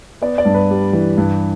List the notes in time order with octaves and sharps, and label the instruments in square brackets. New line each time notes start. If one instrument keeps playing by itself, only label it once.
[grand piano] B3 D5
D5
G2
B4
G3
E3
G2